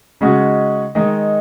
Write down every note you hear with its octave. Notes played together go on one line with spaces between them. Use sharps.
C#3 G#3 D#4 F#4
D#3 G#3 D#4